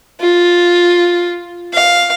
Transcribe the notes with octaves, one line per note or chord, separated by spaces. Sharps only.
F4
F5